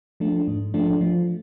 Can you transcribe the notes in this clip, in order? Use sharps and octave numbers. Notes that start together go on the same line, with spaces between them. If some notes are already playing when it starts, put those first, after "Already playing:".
F3 A3 D4
G#2
F3 A3 D4
F3